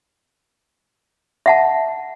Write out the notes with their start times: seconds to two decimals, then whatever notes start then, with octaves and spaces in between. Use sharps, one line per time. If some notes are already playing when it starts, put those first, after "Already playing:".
1.46 E5 F#5 A5